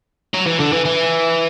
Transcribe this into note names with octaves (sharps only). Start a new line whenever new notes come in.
F#3
E3
D3
E3
E3